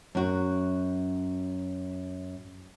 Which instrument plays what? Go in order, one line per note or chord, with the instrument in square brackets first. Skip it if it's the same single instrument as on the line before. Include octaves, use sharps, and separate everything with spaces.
[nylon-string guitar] F#2 F#4